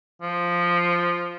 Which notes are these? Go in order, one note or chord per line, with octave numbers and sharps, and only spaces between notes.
F3